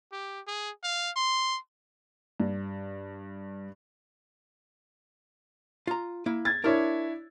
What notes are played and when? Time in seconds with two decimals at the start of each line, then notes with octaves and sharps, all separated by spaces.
0.12 G4
0.47 G#4
0.83 F5
1.16 C6
2.40 G2
5.87 F4 A#5
6.26 A#3 E4
6.45 G#6 A6
6.64 D4 E4 A#4 C#5